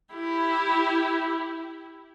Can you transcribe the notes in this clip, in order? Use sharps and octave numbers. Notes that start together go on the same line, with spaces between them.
E4 G4